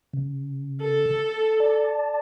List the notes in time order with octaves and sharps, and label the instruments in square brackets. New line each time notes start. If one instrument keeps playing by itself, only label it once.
[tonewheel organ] C#3
[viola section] A4
[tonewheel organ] D5 A5